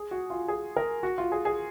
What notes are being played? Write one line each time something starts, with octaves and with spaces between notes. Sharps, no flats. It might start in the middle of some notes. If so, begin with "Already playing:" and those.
Already playing: G#4
F#4
F4
G#4
A#4
F#4
F4
G#4
G#4